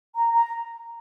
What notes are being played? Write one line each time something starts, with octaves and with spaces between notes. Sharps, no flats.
A#5
A#5